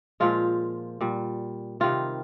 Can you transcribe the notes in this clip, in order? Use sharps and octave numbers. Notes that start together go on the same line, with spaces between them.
A#2 F3 G#3 F4
A#2 G3
C3 D#3 G3 F4